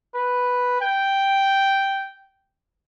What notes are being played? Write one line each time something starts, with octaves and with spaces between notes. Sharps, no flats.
B4
G5